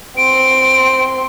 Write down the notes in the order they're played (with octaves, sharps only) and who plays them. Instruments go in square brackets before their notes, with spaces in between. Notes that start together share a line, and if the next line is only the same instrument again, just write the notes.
[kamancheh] C4 C6 [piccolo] D7